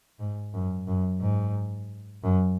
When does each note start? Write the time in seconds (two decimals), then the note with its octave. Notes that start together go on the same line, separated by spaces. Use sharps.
0.19 G#2
0.54 F#2
0.88 F#2
1.21 G#2
2.23 F#2